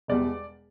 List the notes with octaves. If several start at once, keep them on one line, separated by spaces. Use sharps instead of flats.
E1 E2 B2 G3 D5